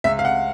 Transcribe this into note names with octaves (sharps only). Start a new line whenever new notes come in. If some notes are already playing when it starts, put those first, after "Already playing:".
C#2 E5
F5
F#5